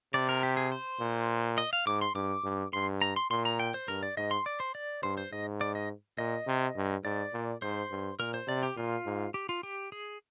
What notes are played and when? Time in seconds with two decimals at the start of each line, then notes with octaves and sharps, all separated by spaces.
0.14 C3 D5
0.29 A#4
0.43 G4
0.57 G#4
0.72 C5
1.01 A#2
1.58 D#5
1.73 F5
1.87 G#2 D6
2.01 C6
2.15 G2 D6
2.44 G2
2.73 G2 C6
3.02 A#5
3.16 C6
3.31 A#2 C6
3.45 A#5
3.59 G5
3.74 C5
3.88 G2 A#4
4.03 D5
4.17 G#2 D#5
4.31 C6
4.46 D5
4.60 C5
4.75 D5
5.03 G2 C5
5.17 C5
5.32 G#2 D#5
5.61 D5
5.75 D#5
6.18 A#2 D#5
6.47 C3
6.76 G2
7.04 G#2 D5
7.33 A#2
7.62 G#2 C5
7.91 G2
8.19 A#2 A#4
8.34 C5
8.48 C3 D5
8.63 G4
8.76 A#2 F4
9.06 G#2
9.34 G4
9.49 F4
9.63 G4
9.92 G#4